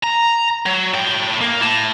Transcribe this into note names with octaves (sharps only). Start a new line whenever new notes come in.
A#5
F#3
A2 G5
A#3
E4 A5